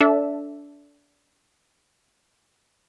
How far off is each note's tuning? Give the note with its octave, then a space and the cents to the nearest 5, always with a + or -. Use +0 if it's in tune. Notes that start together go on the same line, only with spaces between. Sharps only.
D4 -25 A4 +0 E5 +0